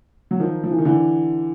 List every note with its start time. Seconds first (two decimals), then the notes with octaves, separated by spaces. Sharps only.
0.31 F#3
0.40 D#3 F3
0.64 F3
0.71 E3
0.78 D#3
0.85 D3 E3